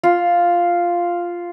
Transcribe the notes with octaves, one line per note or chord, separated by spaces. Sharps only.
F4